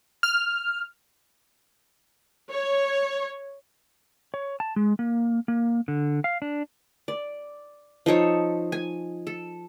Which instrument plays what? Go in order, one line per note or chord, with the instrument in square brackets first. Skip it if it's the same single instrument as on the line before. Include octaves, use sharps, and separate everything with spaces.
[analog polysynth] F6
[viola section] C#5
[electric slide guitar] C#5
A5
G#3
A#3
A#3
D3
F5
D4
[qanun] D5
F3 D#4 A4 C#5
G#5
A4